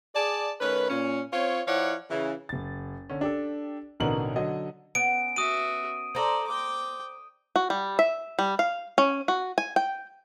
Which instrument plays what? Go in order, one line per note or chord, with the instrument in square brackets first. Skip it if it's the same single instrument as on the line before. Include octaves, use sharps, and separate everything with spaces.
[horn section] G#4 D5 A5
D#3 A3 C#4 B4
A#2 C#4
C4 F4 C#5
F3 E4 C#5 D5 F5 F#5
C#3 E3
[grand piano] F#1 A6
D3 C#4
D4 G4 A4
A1 B2 D3 D#4 A#4 F#7
D3 F#3 D#5
[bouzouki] B3 C#4 [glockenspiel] D7
[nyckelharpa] F#4 E5 [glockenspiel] D#6 D#7
[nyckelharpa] A4 D5 [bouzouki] C5 A#5
[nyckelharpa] G5 D6
[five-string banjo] F#4
G3
E5
G3
F5
C#4
F#4
G#5
G5